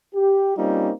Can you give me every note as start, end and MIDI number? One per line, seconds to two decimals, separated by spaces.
0.15 0.57 67
0.57 0.91 55
0.57 0.91 58
0.57 0.91 60
0.57 0.91 61
0.57 0.91 63
0.57 0.91 65